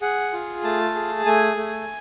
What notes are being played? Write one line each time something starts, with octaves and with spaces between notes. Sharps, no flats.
G#4 F#5
F4
A3 A5
G#4
A3 G#5
A3